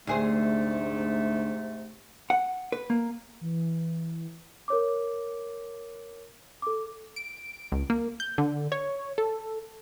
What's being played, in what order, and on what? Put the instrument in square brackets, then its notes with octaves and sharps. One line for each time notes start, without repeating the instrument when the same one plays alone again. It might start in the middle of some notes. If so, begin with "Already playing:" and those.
[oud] D2 G#4 C5 [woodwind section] G#2 C3 A3
[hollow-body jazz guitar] F#5
B4
A#3
[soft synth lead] E3
[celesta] A#4 C#5 D6
A4 D6
[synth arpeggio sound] D7
C#2
A#3
G6
D3
C#5
A4